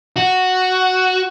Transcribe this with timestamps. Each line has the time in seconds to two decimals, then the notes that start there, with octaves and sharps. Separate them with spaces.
0.16 F#4